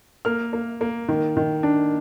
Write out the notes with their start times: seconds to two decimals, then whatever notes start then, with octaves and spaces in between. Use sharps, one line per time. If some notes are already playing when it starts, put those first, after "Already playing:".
0.25 A#3 F6
0.53 A#3
0.81 A#3
1.09 D#3
1.37 D#3
1.63 D4